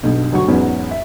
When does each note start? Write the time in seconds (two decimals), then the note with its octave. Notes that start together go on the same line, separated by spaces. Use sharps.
0.03 B1 G2 B2
0.32 D2 G2 F#3 F#4 C#6
0.48 E2 G#2 F#3 B3 C#4
0.91 E5